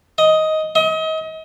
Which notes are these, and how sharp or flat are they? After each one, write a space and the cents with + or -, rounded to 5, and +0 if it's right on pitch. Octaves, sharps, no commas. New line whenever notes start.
D#5 +10
D#5 +35